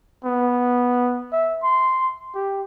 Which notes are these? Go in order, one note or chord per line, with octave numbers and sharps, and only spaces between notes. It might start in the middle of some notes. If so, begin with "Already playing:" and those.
B3
E5
C6
G4